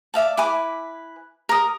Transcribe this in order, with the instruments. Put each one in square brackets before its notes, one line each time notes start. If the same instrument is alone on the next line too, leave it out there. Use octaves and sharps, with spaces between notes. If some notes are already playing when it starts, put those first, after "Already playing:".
[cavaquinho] D5 E5 F5 A5
E4 B4 G#5 D6
A#4 D#6